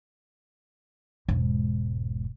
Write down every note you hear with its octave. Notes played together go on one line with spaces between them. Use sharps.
E1 G#2